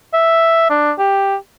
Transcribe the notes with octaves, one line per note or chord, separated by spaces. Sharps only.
E5
D4
G4